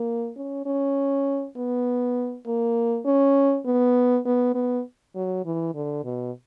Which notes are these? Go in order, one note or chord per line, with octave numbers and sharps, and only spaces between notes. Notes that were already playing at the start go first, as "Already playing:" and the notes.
Already playing: A#3
C#4
C#4
B3
A#3
C#4
B3
B3
B3
F#3
E3
D3
B2